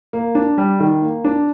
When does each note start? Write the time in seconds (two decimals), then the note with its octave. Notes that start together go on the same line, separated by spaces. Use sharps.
0.13 A#3
0.35 D4
0.58 G3
0.80 D#3
1.02 A#3
1.24 D4